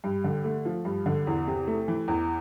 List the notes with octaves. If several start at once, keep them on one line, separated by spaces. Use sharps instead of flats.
G2
D3
A3
F3
G2
D3
E2
C3
A3
E3
E2